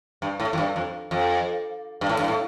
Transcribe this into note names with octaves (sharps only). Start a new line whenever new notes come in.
G2
A2
F2
G2
F2
F2
G2
A2
G2
A2